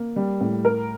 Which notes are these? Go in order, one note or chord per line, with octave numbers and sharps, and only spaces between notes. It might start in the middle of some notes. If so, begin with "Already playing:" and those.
Already playing: A#3
G3
A2
A#4